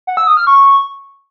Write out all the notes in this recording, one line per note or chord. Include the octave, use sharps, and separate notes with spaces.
F#5
E6
D#6
F6
C#6